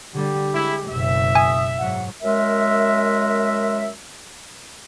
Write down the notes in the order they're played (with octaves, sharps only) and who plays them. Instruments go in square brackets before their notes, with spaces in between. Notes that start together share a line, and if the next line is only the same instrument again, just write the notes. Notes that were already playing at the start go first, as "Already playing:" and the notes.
[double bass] D3 G3 [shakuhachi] G4
[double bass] G#3 [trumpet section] E4
[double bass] F#1 B2 [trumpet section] E5
[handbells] G#5 [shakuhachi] D#6
[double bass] G#2 F#3 [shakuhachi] F#5
[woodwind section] F#2 G#3 A#4 E5